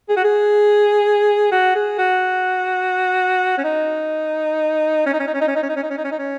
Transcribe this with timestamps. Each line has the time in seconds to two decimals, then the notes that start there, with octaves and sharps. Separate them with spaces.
0.09 G#4
0.17 F#4
0.24 G#4
1.52 F#4
1.75 G#4
1.98 F#4
3.58 C#4
3.64 D#4
5.06 C#4
5.13 D#4
5.20 C#4
5.27 D#4
5.34 C#4
5.41 D#4
5.48 C#4
5.55 D#4
5.63 C#4
5.69 D#4
5.76 C#4
5.83 D#4
5.90 C#4
5.97 D#4
6.04 C#4
6.12 D#4
6.18 C#4